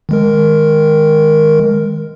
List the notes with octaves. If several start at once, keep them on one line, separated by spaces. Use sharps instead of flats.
D#3 G#3 A#4